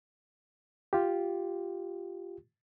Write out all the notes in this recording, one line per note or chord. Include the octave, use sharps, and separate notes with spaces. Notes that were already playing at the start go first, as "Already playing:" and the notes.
F4 G4